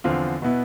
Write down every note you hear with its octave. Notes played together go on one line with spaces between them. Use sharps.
E2 D3 F3 C4 F4
B2 B3 E4